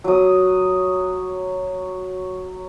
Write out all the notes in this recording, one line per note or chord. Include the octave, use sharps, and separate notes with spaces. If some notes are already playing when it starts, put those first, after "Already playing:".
F#3 D#6